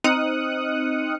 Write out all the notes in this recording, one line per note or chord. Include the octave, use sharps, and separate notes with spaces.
C4 D#4 D#6 F6 F#6 C#7